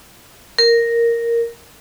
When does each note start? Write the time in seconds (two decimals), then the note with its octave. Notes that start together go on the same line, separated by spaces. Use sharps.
0.58 A#4